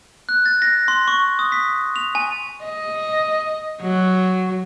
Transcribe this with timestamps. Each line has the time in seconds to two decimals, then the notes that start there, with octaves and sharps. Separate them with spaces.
0.29 F#6
0.46 A6
0.62 A#6
0.88 C6
1.08 C#6
1.39 D#6
1.52 B6
1.96 F7
2.15 G#5
2.64 D#5
3.82 F#3